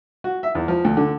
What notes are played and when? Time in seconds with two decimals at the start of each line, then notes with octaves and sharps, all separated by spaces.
0.24 F#4
0.43 E5
0.55 E2
0.68 F3
0.84 D2
0.97 D3